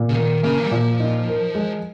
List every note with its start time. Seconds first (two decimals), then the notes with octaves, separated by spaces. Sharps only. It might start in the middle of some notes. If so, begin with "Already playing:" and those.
Already playing: A#2
0.09 C#3
0.15 D#3 A#3
0.43 C#3 A#3
0.64 G3
0.71 A#2 F3
1.00 D#4
1.27 A#4
1.55 G#3